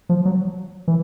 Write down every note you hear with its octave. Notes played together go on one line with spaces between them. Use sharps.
F3
F#3
E3